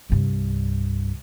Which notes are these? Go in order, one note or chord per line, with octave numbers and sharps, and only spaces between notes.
C2 G2